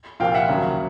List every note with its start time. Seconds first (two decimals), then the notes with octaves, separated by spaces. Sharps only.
0.20 C2 A#2 F3 A#3 F5 G5
0.34 E5 F#5
0.49 D#2 C#3 F#3 A#3